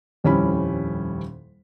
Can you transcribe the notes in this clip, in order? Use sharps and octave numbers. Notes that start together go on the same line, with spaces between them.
D#1 F2 G3 C#4 E4 B5